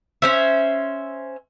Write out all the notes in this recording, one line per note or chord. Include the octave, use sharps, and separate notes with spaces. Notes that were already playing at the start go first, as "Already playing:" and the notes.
C#4 C5 E5